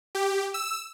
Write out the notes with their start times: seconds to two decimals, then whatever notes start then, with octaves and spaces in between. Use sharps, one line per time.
0.15 G4
0.54 E6